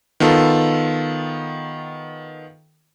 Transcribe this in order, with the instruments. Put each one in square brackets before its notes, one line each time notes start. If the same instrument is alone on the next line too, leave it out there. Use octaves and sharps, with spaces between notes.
[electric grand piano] D#3 B3 F4 A4